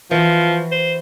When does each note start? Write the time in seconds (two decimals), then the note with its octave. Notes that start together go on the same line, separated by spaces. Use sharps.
0.11 E3 F3 F#4
0.71 C5